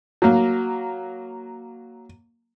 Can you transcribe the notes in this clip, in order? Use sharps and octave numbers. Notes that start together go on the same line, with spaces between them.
F#3 A#3